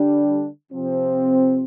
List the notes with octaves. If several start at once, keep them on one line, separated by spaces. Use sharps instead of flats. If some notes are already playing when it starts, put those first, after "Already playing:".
Already playing: D3 G3 D4
C3 F3 C4